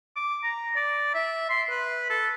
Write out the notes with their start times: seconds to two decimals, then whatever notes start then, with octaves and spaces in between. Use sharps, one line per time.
0.16 D6
0.43 A#5
0.76 D5
1.14 E5
1.50 C6
1.70 B4
2.10 A4